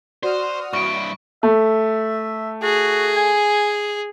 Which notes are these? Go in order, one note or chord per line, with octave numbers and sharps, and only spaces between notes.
F#4 C5 D5 D#6 F6
G2 E4 C#6 D7
A3 E5
F#4 G#4
G#5